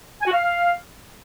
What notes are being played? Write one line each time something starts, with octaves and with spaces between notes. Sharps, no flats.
G#5
F#4
F5